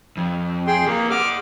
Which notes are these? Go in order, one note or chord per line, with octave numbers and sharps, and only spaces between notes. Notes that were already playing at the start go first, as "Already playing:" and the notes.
F2
G#4 G5 C6
A#3 G#4 B4
G#4 F#5 D6 F6